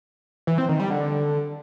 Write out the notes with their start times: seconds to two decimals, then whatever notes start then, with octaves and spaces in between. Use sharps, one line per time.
0.47 E3
0.58 C4
0.69 D#3
0.80 G3
0.90 D3